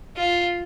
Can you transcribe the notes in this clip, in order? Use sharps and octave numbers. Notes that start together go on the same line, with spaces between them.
F4